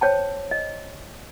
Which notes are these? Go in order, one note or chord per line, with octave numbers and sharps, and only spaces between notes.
C5 C#5 G5 A5
D#5